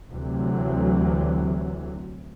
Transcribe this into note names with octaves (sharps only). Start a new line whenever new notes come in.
D2 C3 E3 F#3